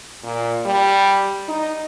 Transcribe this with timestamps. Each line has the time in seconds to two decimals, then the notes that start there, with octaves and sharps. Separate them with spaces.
0.24 A#2
0.66 G3
1.48 D#4